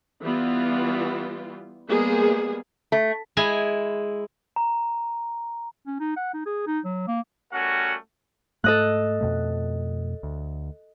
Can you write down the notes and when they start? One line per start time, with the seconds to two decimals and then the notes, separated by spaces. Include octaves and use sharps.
0.22 E3 G3 B3 F4
1.89 G3 G#3 A#3 B3 G#4
2.92 A3
3.37 G#3 E4 G#5
4.56 A#5
5.86 C#4
6.00 D#4
6.16 F#5
6.34 D#4
6.46 G#4
6.67 D#4
6.84 F#3
7.07 A#3
7.53 G3 A3 C#4 F#4 A#4 F#5
8.64 G#2 A3 A4 D#5 F#6
9.21 F2 B2 A3
10.23 D2